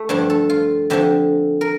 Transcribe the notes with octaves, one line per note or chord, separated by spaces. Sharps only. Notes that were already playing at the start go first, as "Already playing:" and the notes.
Already playing: A3
G2 D3 F3 D4
A4
F4
F2 D3 F3 G4
A#4